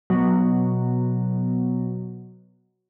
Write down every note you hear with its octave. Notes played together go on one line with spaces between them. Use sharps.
B2 F#3